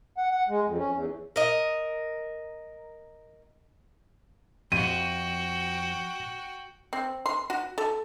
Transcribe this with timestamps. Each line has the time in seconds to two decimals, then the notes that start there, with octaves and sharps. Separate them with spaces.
0.18 F#5
0.31 F#5
0.49 G#3
0.65 F2
0.77 C#4
0.92 E2
1.36 A#4 D#5
4.72 F2 F#4 G5 D#7
6.93 C4
7.26 C6
7.50 F#4
7.78 A4